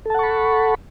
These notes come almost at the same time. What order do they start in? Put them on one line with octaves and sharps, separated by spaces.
A4 A5 F#5 C#6 B5